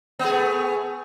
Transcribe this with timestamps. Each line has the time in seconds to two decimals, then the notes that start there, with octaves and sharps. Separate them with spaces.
0.19 B3
0.24 G#4
0.29 A3